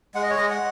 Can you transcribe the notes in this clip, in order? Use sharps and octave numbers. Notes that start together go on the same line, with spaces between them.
G#3 F#5
D#5
C#5
G#3 D#5
F#5